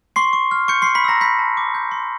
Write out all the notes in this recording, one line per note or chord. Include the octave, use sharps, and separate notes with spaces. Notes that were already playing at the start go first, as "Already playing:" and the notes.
C6 C#6 C7
C#6
F6
C#6 G6 C#7
C6 C7
C#6
B5 B6
A#5 E6 A#6
B5 G6 B6
A5
D6
G6
C6